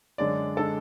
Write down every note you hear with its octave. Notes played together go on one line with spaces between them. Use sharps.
F#2 D3 G#3 D5
D3 G#3 A4